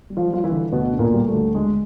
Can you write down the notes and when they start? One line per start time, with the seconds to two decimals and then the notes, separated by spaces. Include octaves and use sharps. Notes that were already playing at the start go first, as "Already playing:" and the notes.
0.10 G3
0.17 F3 F4
0.31 G3 F4
0.44 E3 E4
0.52 D3
0.72 D2 B2 B3
0.93 D3
0.99 A#2 A#3
1.13 G3
1.27 A3
1.34 D2
1.55 D3 G#3